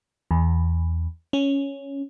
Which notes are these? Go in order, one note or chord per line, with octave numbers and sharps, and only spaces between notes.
E2
C#4